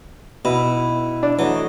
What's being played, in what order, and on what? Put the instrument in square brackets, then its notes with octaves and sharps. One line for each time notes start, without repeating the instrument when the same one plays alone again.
[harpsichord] B2 [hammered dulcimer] E4
[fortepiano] D4
[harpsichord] E3 [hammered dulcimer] F#3 A3 D#5